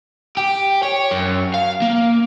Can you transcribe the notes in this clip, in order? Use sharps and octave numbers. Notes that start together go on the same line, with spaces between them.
G4
C#5
F#2
F5
A#3